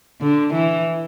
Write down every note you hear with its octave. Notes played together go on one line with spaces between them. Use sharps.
D3
E3